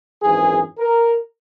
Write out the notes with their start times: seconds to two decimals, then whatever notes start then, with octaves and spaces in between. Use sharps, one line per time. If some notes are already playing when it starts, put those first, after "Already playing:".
0.22 G#1 F#2 E3 G#4
0.77 A#4